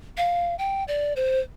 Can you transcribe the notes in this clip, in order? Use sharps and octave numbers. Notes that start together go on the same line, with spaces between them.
F5
G5
D5
C5